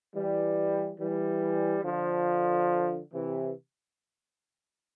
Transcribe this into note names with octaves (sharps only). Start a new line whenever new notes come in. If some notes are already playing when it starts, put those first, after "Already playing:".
E3 G3
E3 G3
D3 F3
C3 E3